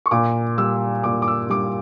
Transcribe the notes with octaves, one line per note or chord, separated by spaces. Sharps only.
C#6
A#2 D6
G3 E6
A#2 D6
D6
E6
G3 D6